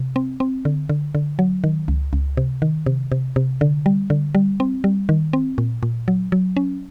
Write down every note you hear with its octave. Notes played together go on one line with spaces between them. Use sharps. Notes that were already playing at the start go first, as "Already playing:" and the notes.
Already playing: C3
C4
C4
D3
D3
D3
F#3
D#3
C#2
C#2
C3
D#3
C3
C3
C3
D3
G3
D3
G3
C4
G3
D#3
C4
A#2
A#2
F#3
F#3
C#4